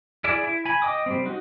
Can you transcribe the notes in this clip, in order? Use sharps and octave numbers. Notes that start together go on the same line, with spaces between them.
E4 G#4 D5 E5
E4
G#5 B5
D#5 G5 D6 D#6
G3 A#3 C4
D#4 F#4